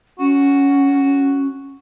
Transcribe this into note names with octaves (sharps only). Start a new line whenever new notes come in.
C#4 F#4